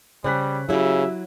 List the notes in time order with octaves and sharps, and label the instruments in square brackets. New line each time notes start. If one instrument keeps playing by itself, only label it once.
[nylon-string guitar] C#3 G#4 [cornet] G3 [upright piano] C5 F#6 B6
[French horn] C#3 [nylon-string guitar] F#3 E4 [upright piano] F#4 G4 [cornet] E5